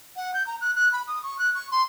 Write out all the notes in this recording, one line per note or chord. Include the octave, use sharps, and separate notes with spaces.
F#5
G6
A#5
F#6
F#6
B5
D#6
C#6
F#6
C#6
C6